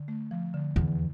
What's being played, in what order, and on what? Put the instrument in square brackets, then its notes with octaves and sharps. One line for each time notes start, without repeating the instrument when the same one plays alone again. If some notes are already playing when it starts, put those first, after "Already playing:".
Already playing: [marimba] D3
A3
F3
D3
[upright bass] E2 [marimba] D3